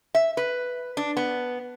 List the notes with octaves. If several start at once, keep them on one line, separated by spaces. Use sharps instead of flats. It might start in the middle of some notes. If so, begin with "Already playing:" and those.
E5
B4
D4
B3